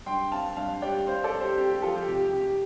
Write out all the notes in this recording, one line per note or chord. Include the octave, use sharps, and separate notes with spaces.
G2 G5 C6
C4 F5 A5
G2 F5 A5
G3 D5 G5
C4 C5 F5
A4 D5
C4
G4 C5
C4 G4
G4
F2 F4 A4
G4
C3 G4
G4
C3
G4